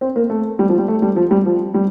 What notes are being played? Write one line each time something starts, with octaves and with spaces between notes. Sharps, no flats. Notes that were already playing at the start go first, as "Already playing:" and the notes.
C4
A#3
A3
G3
F3
G3
A3
G3
F3
G3
F3
G3